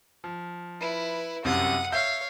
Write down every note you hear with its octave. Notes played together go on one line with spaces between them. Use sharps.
F3
E4 B4
C2 F#2 C3 F#5 D#6
C#5 E5 F5 G6